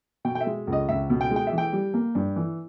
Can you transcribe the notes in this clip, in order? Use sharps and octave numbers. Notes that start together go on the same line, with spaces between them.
B2 G5
G5
E5
G#3
C#2
D#5
C#2 E5
B2
G5
G#3
G5
E3 E5
G5
G3
A#3
G2
E3